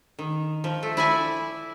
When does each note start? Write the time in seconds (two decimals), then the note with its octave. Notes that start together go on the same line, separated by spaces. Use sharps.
0.19 D#3
0.64 F3
0.83 A3
0.97 E4 D5 G#5